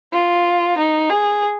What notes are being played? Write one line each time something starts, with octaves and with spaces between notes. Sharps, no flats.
F4
D#4
G#4